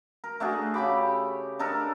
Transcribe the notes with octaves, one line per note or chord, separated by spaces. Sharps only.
A#4
A3 D4 F#4 G#4
C#3 G4 B5 D6
D4 D#4 A4 A#4